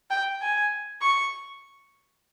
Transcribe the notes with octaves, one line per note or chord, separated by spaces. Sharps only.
G5
G#5
C#6